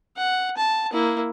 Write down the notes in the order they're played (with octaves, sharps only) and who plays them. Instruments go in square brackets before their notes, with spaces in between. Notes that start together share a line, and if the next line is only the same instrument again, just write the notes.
[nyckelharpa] F#5
A5
A#3 E4